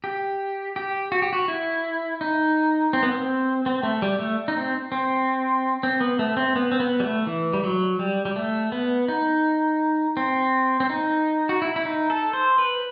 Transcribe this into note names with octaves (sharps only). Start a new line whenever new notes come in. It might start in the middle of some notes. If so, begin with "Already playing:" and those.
G4
G4
F#4
G4
F#4
E4
D#4
C4
B3
C4
C4
A3
G3
A3
D#4
C4
C4
C4
B3
A3
C4
B3
C4
B3
G3
A3
E3
G3
F#3
G3
G3
A3
B3
D#4
C4
C4
D#4
F#4
E4
E4
D#4
A4
C5
B4